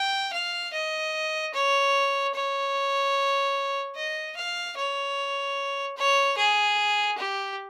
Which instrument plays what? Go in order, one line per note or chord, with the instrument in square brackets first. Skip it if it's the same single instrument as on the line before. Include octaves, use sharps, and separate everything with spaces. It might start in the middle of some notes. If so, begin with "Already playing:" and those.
Already playing: [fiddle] G5
F5
D#5
C#5
C#5
D#5
F5
C#5
C#5
G#4
G4